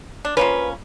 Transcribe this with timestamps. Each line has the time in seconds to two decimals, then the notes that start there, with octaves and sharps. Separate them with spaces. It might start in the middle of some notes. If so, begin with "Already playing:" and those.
0.25 D4
0.37 F3 A#3 C#4 B4